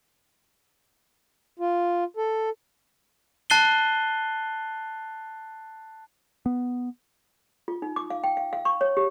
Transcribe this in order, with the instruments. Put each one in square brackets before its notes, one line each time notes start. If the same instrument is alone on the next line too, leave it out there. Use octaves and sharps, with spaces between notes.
[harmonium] F4
A4
[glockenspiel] A5 F#6 A6 C7 D#7 G7
[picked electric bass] B3
[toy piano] F4
D#4
D6
F5
G5
F5
F5
C#6
C#5
G4